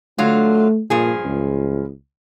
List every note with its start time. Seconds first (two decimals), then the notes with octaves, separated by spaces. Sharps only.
0.18 D3 F#3 A3 F4
0.90 G2 A#2 F3 G#4
1.24 C#2